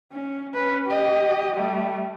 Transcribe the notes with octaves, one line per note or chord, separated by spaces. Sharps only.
C#4
C#4 B4
G4 D#5
G3 A3